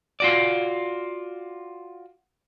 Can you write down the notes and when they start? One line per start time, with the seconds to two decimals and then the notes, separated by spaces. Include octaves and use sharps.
0.20 F4 F#4 D5